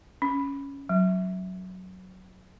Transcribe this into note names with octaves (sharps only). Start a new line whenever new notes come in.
C#4
F#3